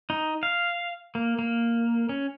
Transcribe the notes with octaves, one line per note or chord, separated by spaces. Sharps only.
D#4
F5
A#3
A#3
C#4